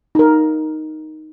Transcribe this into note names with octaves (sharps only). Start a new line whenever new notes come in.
D#4 A#4